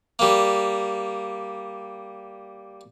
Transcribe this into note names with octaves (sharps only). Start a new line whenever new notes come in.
G3 A#3